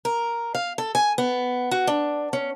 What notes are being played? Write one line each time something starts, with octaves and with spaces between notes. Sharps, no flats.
A#4
F5
A4
G#5
B3
F#4
D4
C#4